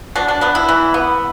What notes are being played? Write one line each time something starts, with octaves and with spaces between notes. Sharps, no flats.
B2 D4
D4
B3 D4
E4
E3
B3